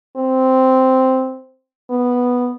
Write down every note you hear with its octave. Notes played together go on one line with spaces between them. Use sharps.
C4
B3